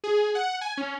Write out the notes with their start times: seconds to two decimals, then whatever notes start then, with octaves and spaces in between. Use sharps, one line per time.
0.04 G#4
0.35 F#5
0.61 G#5
0.77 C#4